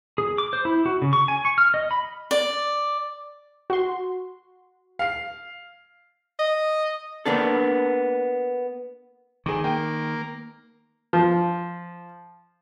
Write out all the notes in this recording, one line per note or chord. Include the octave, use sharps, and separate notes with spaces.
G#4
D6
C5
E4
F#4
C#3
C#6
G#5
C#6
F6
D#5
B5
D5
F#4 C6
F5 C7
D#5
A#3 B3 D4 A4
D#3 G#4 D6
A#3 G5
F3